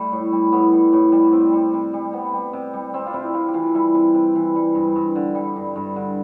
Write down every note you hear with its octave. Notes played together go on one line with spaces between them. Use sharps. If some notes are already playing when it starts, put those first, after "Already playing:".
Already playing: G3 A3
A2
G3
A2 B3
G3
A2
G3
C3 C4
G3
C3
G3
C3 B3
G3
C3
G3
G3 C4
F4
C3 E4
C3 F4
G4
E3 F4
G3 E4
C3
C3
E3
G3
G2
G2
D3
G3
G2
G2
D3